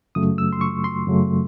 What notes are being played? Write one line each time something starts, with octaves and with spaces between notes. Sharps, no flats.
F#2 C#3 F#3 A3 D#6
E6
C6
C#6
C6
F#2 C#3 F#3 A3